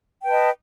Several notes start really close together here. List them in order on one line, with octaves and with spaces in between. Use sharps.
G5 B4 A5 D#5